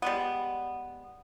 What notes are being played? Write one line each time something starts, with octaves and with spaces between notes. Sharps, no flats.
G3 G#3 B3